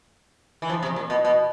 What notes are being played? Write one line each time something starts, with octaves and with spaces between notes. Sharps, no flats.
E3
F3
C3
A#2
B2
B2